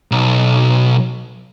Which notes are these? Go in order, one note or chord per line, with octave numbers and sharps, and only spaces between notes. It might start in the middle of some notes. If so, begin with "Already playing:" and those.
B1